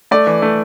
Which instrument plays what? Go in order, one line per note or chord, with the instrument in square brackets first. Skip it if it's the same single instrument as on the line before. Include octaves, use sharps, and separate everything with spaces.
[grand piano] A3 D5
E3
A3